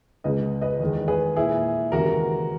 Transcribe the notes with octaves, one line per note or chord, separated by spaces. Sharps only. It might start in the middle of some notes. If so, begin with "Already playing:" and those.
C#2 C#3 G#3 B4 D#5
B4 D#5
E2 D#3 G#3
G#4 B4
A#2 G#3 E4 G#4
D#2 C#3 E3 G#3 F#4 A#4